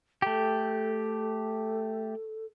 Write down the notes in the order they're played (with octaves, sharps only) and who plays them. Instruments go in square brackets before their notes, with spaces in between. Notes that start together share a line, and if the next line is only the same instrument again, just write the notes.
[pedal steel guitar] A3 G4 [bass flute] A4